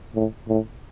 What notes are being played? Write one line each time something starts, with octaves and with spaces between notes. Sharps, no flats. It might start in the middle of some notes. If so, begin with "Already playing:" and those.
A2
A2